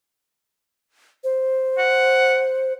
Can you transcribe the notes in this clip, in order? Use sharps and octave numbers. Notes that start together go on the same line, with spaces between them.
C5
F#5